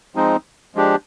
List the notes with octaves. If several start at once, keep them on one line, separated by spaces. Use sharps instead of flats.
F3 G#3 C4 D#4
F3 G#3 D4 G4